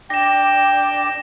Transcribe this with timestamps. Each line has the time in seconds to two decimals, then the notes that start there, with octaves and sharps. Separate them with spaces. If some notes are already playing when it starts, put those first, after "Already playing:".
0.10 D4 G5 A#6 E7